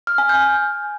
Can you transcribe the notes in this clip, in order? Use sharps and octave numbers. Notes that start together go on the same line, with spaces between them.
F6
G#5
G6